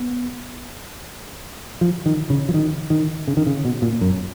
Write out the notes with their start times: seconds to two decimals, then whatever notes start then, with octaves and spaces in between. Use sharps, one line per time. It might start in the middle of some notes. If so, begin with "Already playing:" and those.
Already playing: B3
1.81 F3
2.06 D#3
2.30 C#3
2.49 F3
2.54 D#3
2.90 D#3
3.28 C#3
3.37 D#3
3.47 C#3
3.65 B2
3.82 A#2
4.01 F#2